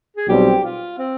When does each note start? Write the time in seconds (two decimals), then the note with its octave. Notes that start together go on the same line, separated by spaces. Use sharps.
0.16 G#4
0.28 B1 B2 G3 C4 G4
0.64 F4
0.98 C4